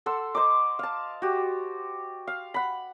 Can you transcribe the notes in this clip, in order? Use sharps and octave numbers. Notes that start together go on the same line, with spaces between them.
A4 F#5 C6 E6
C5 D#5 A#5 D6
F5 A5
F#4 G4
F5
F#5 B5